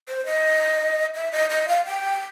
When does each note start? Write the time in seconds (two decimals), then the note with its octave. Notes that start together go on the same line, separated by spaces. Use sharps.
0.08 C5
0.26 D#5
1.15 E5
1.32 D#5
1.50 D#5
1.68 F5
1.86 G5